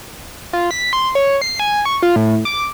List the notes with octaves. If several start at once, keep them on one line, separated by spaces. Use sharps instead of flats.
F4
B6
C6
C#5
C7
G#5
C#6
F4
A2
D6